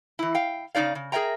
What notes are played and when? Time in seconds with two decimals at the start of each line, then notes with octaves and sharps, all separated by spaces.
0.19 E3 E4
0.35 F5 G5
0.75 C#3 F3 D#4 D5 F5
0.95 C#3
1.12 G#4 A#4 D5 E5 G5 A#5